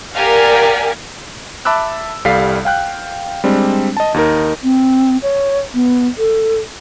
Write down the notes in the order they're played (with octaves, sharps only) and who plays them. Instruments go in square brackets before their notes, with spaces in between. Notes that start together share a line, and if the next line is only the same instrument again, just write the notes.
[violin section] G4 A#4 D5 F5 F#5 G#5
[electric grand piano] E5 A5 B5 D6 E6 F#6
C2 G3 A4 F5 B6 C7
F5 G5 F#6
G3 G#3 C4 D4
D#5 A5
D#2 D#4 A#4
[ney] C4
C#5
B3
A4